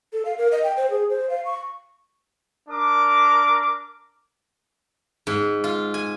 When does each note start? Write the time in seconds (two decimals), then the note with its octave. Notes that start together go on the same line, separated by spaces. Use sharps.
0.13 A4
0.25 F5
0.38 A#4
0.52 D#5
0.64 G5
0.77 C5
0.90 G#4
1.10 C5
1.30 F5
1.45 C#6
2.69 D4 A#4 D6
5.27 G#2
5.64 F4
5.94 G#5